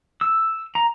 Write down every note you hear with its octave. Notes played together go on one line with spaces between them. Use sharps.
E6
A#5